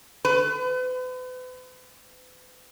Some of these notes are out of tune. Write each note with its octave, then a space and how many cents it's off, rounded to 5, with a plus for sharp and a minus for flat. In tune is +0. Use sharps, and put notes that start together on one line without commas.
B4 +40